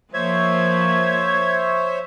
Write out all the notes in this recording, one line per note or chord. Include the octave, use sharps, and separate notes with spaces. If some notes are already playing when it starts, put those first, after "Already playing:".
F3 A#3 C5 C#5 E5 G#6